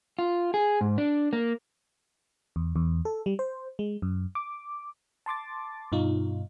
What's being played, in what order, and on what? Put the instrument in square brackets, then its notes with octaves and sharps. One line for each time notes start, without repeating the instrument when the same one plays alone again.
[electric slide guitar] F4
G#4
G#2
D4
A#3
[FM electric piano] E2
E2
A4
G3
C5
G#3
F#2
D6
A5 C6 D6 A6
G2 B2 D#4 F4